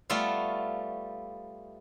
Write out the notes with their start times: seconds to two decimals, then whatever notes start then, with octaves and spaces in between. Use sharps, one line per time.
0.10 G3 A3 B3 F4 E5 F5